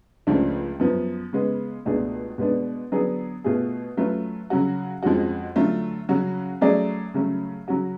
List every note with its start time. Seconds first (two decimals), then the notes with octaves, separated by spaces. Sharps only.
0.27 C#2 C#3 F3 A3 D4
0.80 F#2 F3 B3
1.33 C#3 G#3 B3
1.85 C#2 B2 A3 D4 G#4
2.38 B2 G#3 B3 D4
2.92 D3 F#3 B3 D4 G#4
3.44 B2 A3 F4 G#4
3.97 F#3 A3 C#4 F4 B4
4.50 C#3 F#3 C#4 F#4
5.03 F2 F3 G#3 C#4 F#4
5.56 D3 F#3 A3 F4
6.09 C#3 F#3 C#4 F#4
6.61 F#3 A3 C#4 G#4 D5
7.14 C#3 F#3 A3 C#4
7.68 C#3 F#3 C#4 F#4